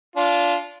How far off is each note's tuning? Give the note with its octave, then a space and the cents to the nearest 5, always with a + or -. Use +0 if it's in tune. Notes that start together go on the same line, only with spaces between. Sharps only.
D4 -25 F4 -5